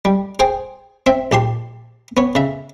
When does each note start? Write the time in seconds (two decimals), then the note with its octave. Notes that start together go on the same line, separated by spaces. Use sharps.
0.05 G3
0.39 G#4 C5 G5 G#5
1.06 C4 E5
1.32 A#1 G4 A5 C6
2.17 B3 C#5
2.35 C#3 E5